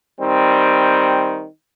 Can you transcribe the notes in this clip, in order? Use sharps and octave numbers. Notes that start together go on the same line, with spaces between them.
D#3 G3 C4